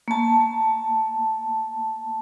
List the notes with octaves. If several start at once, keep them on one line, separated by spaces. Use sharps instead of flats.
A#3 A5